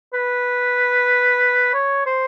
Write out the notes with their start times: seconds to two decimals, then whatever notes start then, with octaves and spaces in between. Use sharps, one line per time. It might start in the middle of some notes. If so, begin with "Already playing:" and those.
0.14 B4
1.74 C#5
2.06 C5